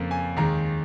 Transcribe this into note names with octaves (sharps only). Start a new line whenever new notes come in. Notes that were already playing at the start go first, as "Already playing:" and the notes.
Already playing: F2 C#3 F3 A#3
G#5
D#2 D#3 G#3 A#5